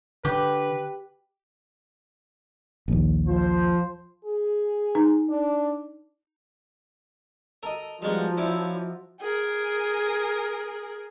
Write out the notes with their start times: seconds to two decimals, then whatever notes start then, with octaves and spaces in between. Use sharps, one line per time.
0.25 D3 G4 B4
2.88 A#1 D#2
3.28 F3 C5
4.25 G#4
4.95 D#4
5.29 D4
7.63 A4 A#4 D#5 A#5
8.02 F3 G3 G#3 B3 D#4 F4 F#4
8.37 C#4 E4 D5 E5
9.20 G#4 A#4